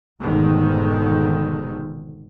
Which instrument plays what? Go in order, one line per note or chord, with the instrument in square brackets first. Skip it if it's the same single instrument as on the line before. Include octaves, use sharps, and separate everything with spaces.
[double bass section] F1 G#2 B2 D3 D#3